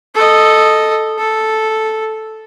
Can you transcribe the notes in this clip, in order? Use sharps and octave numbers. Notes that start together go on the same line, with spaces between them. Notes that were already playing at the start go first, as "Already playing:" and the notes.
A4 D#5
A4